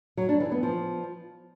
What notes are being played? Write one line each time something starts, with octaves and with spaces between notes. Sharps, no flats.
F#3
D4
E3
B3
F3